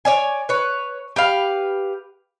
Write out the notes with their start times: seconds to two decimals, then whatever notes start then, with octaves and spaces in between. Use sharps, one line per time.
0.05 C#5 D5 G#5
0.49 B4 C#5
1.16 G4 B4 F5